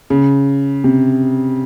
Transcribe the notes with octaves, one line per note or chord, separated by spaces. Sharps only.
C#3
C3